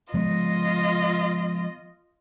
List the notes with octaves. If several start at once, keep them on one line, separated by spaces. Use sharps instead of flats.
F3 G#3 B3 F4 D#5